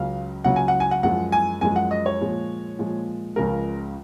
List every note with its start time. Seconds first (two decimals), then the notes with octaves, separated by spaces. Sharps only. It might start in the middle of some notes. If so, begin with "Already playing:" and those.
Already playing: C#2 C#3 F#3 F5
0.44 C#2 C#3 F#3 F#5
0.56 G#5
0.68 F#5
0.80 G#5
0.91 F#5
1.03 F#2 F3 G#3 F#5
1.32 G#5
1.61 F#2 F3 G#3 G#5
1.76 F#5
1.91 D#5
2.06 C#5
2.21 A#2 F3 G#3
2.78 A#2 F3 G#3
3.36 C#2 C#3 F3 G#3 A#4